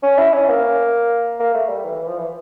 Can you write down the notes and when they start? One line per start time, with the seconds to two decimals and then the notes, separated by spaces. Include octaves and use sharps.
0.03 C#4
0.18 E4
0.33 C#4
0.49 A#3
1.40 A#3
1.54 A3
1.69 G3
1.84 E3
1.96 E3
2.07 F3
2.18 E3